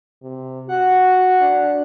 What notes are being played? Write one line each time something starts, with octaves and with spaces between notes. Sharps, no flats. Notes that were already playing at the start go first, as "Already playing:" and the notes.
C3
F#4 F#5
D4